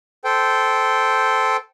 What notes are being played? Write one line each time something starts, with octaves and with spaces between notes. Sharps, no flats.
A4 C5 G5